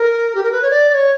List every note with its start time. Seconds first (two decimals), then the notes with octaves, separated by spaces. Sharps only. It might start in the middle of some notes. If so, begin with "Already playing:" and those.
Already playing: A#4
0.35 G4
0.43 A#4
0.52 B4
0.62 C#5
0.71 D5
0.90 D5
0.94 C#5